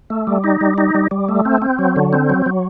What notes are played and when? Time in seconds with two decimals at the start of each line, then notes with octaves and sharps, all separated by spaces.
0.10 A3
0.27 G3
0.44 D#4
0.61 G3
0.78 D#4
0.95 G3
1.11 G3
1.29 A3
1.45 C4
1.62 C4
1.79 F#3
1.96 D3
2.13 C4
2.30 F#3
2.46 F#3